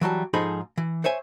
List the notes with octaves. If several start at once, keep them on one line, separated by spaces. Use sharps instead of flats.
E3 F#3 G3 A5
G#2 F3 D#4 G#4 A4 B5
E3
C5 C#5 E5 G#5